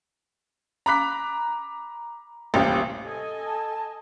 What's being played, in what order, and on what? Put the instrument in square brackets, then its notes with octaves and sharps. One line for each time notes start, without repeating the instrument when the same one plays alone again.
[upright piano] A#5 B5 D6 F#6 B6
D#1 A1 C3 G3
[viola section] A4 D#5 G#5
[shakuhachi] A5